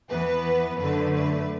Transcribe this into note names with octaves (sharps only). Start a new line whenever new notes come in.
E2 E3 B3 B4
F#2 D3 A3 B4
B4